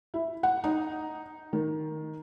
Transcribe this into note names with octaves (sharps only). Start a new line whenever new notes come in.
E4
F#5
D#4
D#3